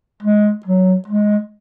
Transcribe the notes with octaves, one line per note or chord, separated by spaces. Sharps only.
G#3
F#3
G#3